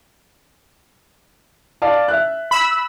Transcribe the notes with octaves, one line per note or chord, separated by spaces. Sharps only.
D5 F5 A5
E5 F#6
B5 E6